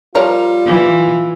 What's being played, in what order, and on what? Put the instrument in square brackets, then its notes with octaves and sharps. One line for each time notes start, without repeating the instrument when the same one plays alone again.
[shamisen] F3 A#4 C#5 [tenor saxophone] G3 [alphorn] F4
[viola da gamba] E3